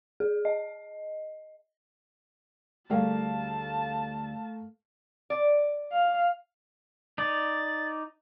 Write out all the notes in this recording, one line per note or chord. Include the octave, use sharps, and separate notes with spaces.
G#4
D#5
D2 G3 A3 G#4 A#4 F5 A5
D5
F5
D#4 D5 A6